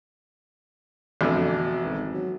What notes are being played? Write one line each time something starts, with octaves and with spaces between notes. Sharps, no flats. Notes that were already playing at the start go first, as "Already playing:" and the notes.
A1 F2 B2 D3
G#1
F#3